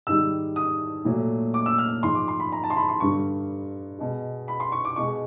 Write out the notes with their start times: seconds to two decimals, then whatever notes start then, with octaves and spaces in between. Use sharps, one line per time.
0.07 G#2 D#3 G3 E6
0.56 D#6
1.05 A#2 F#3 A3
1.54 D6
1.66 E6
1.78 F6
2.03 G#2 F3 G#3 C6
2.15 D6
2.28 C6
2.40 B5
2.52 A#5
2.64 A5
2.70 C6
2.77 B5
2.88 C6
3.00 G2 D3 G3 C#6
3.99 B2 G#3
4.48 B5
4.60 C6
4.72 C#6
4.85 D6
4.96 B2 G#3 C#6